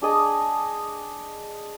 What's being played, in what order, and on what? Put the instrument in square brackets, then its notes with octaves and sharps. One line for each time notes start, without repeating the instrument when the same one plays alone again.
[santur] D4 G#4 D#5 A5